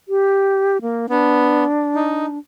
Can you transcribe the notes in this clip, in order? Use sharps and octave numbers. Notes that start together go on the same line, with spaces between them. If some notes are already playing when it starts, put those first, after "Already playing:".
G4
A#3
B3 D4
D#4